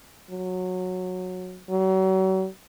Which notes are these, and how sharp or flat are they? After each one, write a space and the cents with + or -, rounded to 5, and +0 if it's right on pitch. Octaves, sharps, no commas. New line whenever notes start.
F#3 -15
F#3 +40